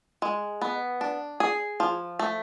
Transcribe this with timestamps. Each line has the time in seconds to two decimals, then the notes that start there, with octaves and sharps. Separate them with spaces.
0.22 G#3
0.62 B3
1.01 D4
1.40 G#4
1.80 F3
2.19 A3